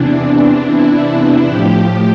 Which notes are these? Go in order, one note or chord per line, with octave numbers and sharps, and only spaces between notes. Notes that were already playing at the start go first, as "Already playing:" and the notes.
Already playing: E2 C3 E3 D4
E4
A2 F3 G4